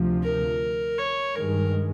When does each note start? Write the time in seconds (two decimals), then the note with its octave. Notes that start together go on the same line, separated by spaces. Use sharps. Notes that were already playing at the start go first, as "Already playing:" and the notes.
Already playing: D2 C3 F3
0.23 A#4
0.98 C#5
1.35 G2 D#3 G#3 A#4